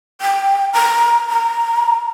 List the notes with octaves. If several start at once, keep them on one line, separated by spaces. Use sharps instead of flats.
G5
A#5
A#5